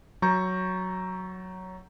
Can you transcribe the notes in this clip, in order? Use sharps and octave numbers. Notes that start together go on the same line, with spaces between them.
F#3 A#5 C#6 G6